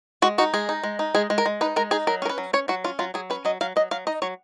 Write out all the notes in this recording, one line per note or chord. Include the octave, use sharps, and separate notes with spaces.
G#3 F#4
D#4 F#4
G#3 G#4
D#4
G#3
D#4
G#3 G#4
G#3
A#4
G#3
D#4 B4
G#3 A#4
D#4 G#4
F#3 A#4
C#4 A#4
B4
F#3
C#4 C#5
F#3 F#4
C#4 F4
F#3 F4
F#3 G#4
C#4 B4
F#3 D#5
F#3 F5
F#3 D#5
F#3 F5
D#4 D#5
F#3 C#5